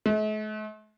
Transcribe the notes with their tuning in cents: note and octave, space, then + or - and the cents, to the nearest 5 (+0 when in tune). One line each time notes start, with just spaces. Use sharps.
A3 -45